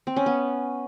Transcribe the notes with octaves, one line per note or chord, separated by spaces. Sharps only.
C4
C#4
B3